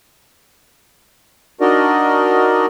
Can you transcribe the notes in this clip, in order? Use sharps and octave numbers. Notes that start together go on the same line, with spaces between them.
D4 D#4 F#4 A#4 D5 D#5